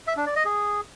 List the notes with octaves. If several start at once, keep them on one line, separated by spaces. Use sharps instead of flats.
E5
D4
D5
D#5
G#4